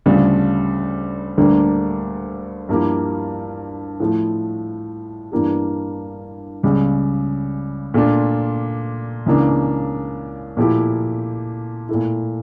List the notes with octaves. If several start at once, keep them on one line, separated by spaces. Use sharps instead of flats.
D2 C#3 G3 D4 F4
D2 D3 G3 A#3 D4
G2 F3 A#3 E4 G4
A2 F3 A3 E4
G2 E3 A#3 D4 G4
C#2 C#3 G3
A#2 A3 D4 F4
C#2 C#3 E3 A#3 D4
A#2 F3 A3 E4 G4
A#2 A3 E4